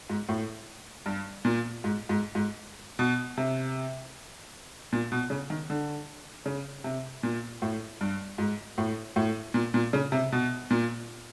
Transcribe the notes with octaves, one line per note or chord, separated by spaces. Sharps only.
G#2
A2
G2
A#2
G#2
G#2
G#2
B2
C3
A#2
B2
C#3
D#3
D3
C#3
C3
A#2
A2
G2
G#2
A2
A2
A#2
A#2
C#3
C3
B2
A#2